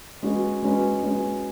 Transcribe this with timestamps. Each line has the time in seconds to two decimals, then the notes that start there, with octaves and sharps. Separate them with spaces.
0.23 G#3 C#4 F#4 B4
0.62 G#3 C#4 F#4 B4
1.03 G#3 C#4 F#4 B4